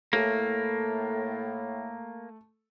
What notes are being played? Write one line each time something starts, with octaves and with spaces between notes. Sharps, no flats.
A2 A3 A#3 A4